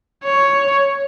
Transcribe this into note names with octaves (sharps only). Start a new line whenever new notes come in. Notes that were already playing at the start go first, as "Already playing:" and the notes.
C#5